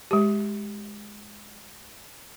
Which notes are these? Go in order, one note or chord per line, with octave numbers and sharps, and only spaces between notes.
G#3 G4